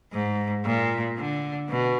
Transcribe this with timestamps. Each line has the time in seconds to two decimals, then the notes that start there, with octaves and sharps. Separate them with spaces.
0.13 G#2
0.65 A#2
1.18 D3
1.70 B2